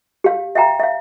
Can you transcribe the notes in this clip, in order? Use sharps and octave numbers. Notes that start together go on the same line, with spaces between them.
G4 F5
E5 F5 G5 A#5
E5 F5